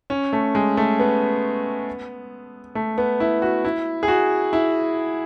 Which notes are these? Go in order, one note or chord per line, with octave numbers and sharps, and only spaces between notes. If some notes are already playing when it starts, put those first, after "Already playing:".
C#4
A3
G#3
A3
B3
A3
B3
E4
F#4
E4
G#4
F#4
E4